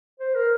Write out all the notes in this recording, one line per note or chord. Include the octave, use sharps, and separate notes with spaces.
C5
A#4